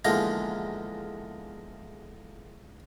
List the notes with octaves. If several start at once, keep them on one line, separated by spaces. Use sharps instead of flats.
E2 D3 F3 G#3 A#3 A#5